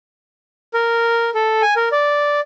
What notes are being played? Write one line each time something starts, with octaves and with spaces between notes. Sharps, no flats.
A#4
A4
G#5
A#4
D5